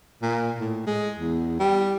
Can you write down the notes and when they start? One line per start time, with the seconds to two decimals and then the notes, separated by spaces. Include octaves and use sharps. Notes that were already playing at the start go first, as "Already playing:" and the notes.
0.22 A#2
0.60 A2
0.86 G#3
1.19 E2
1.59 G3